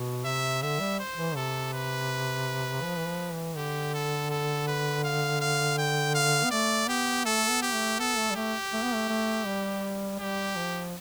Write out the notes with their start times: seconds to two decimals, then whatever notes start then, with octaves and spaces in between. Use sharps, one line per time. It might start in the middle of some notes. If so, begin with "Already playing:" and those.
Already playing: B2
0.25 C3 E5
0.62 D3 E5
0.80 G3
0.99 C5
1.17 E3
1.36 C3 A4
1.73 B4
2.83 F3
2.98 E3
3.07 F3
3.32 E3
3.56 D3 G4
3.94 A4
4.30 A4
4.67 B4
5.04 F5
5.41 F5
5.78 G5
6.15 F5
6.44 B3
6.51 A3 D5
6.88 B3 G4
7.25 A3 A4
7.50 B3
7.62 G4
7.74 A3
7.99 B3 A4
8.18 A3
8.31 G3
8.35 A3 G4
8.73 A3
8.83 B3
8.94 A3
9.09 A3
9.46 G3
10.20 G3 G4
10.56 F3